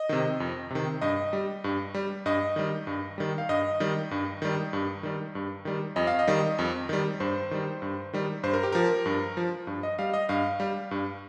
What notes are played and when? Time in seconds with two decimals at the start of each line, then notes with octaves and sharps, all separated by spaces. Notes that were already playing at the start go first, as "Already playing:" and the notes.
Already playing: D#5
0.09 C3 D#3
0.40 F2
0.70 C3 D#3
1.01 G2 D#5
1.33 G3
1.64 G2
1.94 G3
2.26 G2 D#5
2.56 D#3 G3
2.87 G2
3.18 D#3 G3
3.38 F5
3.49 G2 D#5
3.80 D#3 G3
4.11 G2
4.42 D#3 G3
4.73 G2
5.03 D#3 G3
5.35 G2
5.65 D#3 G3
5.96 F2 D#5
6.07 F5
6.19 D#5
6.27 D#3 G3
6.59 F2
6.89 D#3 G3
7.20 G2 C5
7.51 D#3 G3
7.82 G2
8.13 D#3 G3
8.43 G2 C5
8.53 A#4
8.63 G4
8.72 F3 A#4
9.06 G2
9.37 F3
9.67 G2
9.83 D#5
9.99 G3 F5
10.13 D#5
10.29 G2 F5
10.60 G3
10.91 G2